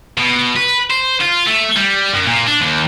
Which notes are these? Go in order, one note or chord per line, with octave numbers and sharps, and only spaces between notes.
B2
B4
C5
F4
A3
G3
F#2
A#2
D4
D#2